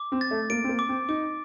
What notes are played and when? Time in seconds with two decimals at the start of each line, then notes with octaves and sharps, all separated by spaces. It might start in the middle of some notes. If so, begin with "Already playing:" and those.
Already playing: D6
0.12 C4
0.21 A6
0.31 A3
0.50 A#3 D7
0.64 C4
0.69 A#3
0.79 D6
0.89 C4
1.09 D#4 D6